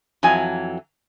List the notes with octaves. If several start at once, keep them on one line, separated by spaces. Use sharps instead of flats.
F2 E3 F#3 G#5